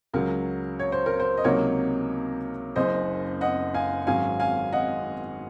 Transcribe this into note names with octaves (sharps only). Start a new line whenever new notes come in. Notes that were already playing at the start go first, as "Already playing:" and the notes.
C#2 C#3 F#3 A#4
C#5
C5
A#4
C5
D#5
C#2 C3 F#3 A#3 D#4 A#4 C#5
F#1 F#2 C#3 C5 D#5
D#5 F#5
F5 G#5
G#1 G#2 F#3 C#4 F5 G#5
F5 G#5
D#5 F#5